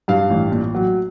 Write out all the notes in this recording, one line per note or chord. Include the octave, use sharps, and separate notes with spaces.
G2 F5
A1
A#2
F#3